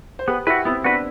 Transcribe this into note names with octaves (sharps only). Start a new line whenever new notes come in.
C5
B3 G4 B4
E4 F#4 G4 B4
B3 C4 E4
B3 D4 F#4 B4